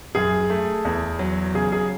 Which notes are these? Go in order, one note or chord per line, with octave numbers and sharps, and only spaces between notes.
F#2 G#4
A3
E2
F#3
C#3 G#4
G#4